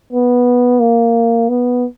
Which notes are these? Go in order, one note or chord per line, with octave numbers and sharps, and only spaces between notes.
B3
A#3
B3